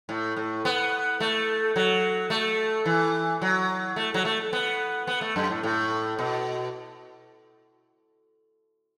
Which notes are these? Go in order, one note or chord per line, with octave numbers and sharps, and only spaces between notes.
A2
A2
B3
A3
F#3
A3
E3
F#3
A3
F#3
A3
B3
B3
A3
F#2
A2
A2
B2